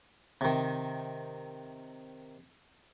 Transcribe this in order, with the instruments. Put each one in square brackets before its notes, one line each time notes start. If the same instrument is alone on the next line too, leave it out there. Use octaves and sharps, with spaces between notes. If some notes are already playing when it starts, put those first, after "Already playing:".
[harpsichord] C3 D#3